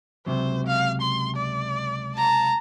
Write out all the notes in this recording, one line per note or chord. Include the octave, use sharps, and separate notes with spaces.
C#2 C3 F#3 C5
F5
C6
D5
A5 A#5